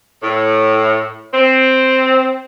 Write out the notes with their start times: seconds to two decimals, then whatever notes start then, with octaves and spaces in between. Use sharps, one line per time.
0.23 A2
1.34 C4